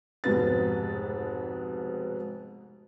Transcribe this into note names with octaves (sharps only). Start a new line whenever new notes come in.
F1 G#2 B2 B4 A6